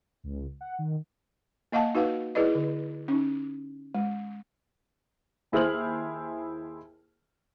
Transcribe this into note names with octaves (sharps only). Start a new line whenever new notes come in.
C#2
F#5
D#3
A#3 D#5 F5 F#5 A5
D#4 F#4 B4 F5 F#5
E4 G#4 B4 D5 D#5
D3
C#4 D#4
G#3
D#2 E4 G#4 C5 F6 F#7